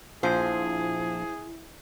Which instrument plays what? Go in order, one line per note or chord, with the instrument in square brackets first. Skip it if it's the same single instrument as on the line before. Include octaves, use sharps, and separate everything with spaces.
[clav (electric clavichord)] A#1 F3 [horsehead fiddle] E4 [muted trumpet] G#4 [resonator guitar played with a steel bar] C5